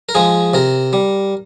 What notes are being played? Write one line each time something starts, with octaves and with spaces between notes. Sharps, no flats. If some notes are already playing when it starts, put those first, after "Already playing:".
A#4
F3 G#3 G#4
C3 A#4
G3